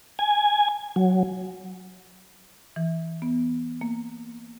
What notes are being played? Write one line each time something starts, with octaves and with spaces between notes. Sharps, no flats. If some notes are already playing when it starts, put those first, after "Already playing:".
G#5
F#3
E3
B3
A#3